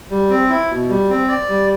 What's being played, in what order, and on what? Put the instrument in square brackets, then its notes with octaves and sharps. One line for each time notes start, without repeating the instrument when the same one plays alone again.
[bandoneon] G3
C4
E4
B2
G3
C4
D5
G3